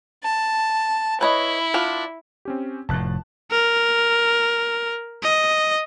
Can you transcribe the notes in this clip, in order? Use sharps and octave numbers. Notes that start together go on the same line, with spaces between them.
A5
E4 B4 C#5 D#5
B3 D4 F4
C4 C#4 G4
F1 A2 A5 F#6
A#4
D#5